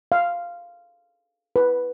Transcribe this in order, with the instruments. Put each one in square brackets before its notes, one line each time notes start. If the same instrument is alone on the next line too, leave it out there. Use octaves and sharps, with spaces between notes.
[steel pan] F5
B4